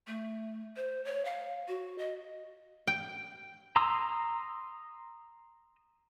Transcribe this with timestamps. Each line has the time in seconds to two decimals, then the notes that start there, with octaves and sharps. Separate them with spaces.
0.07 A3
0.76 C5
1.05 C#5
1.25 F5
1.68 F#4
1.98 D#5
2.87 G5
3.76 A#5 C6 D#6 E6